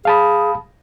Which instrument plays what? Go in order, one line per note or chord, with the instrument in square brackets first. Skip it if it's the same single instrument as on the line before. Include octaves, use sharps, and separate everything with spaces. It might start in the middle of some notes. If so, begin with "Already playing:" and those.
[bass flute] G#4 [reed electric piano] F5 A5 B5